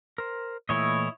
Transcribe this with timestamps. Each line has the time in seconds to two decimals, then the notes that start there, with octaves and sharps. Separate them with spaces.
0.18 A#4 C5
0.69 A#2 E3 A3 E4 C#5 D#5